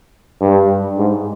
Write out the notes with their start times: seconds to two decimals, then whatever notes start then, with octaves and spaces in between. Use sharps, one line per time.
0.41 G2
0.98 G#2